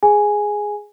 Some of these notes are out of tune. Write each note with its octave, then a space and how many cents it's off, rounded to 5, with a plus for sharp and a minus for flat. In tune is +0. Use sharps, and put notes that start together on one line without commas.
G#4 +0 G#5 +0